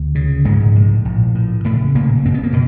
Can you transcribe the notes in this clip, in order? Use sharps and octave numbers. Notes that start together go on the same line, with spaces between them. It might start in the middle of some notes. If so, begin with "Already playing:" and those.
Already playing: D2
C#3
A#1 G#2 G#3
A2
A#1
A2
A2 C#3 A3
F#1 A#2 A#3
F#1 C4
B3
A#3
B2